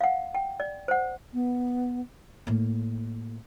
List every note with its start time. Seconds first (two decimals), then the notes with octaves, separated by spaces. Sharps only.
0.01 F5 F#5
0.35 G5
0.60 D5
0.88 C5 F#5
1.33 B3
2.47 A2 A#3